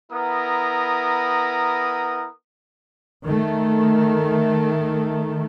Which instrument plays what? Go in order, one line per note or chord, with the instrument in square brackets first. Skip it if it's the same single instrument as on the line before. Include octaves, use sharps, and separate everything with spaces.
[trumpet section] B3 E4 A#4 A#5 D#6
[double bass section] D#3 A3